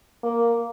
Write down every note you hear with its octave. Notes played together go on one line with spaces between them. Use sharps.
A#3